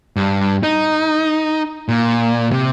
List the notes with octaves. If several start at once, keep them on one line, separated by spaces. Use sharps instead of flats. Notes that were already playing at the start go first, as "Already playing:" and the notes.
G2
D#4
A#2
C3